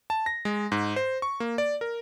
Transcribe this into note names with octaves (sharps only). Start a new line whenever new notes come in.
A5
A#6
G#3
G#2
C5
C#6
A#3
D5
A#4